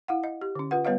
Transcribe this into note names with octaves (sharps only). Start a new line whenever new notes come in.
E4 F5 F#5
D#5
G4
D3 C#4
F4 B4 F#5
G3 B3 B4 C#5 D#5 F5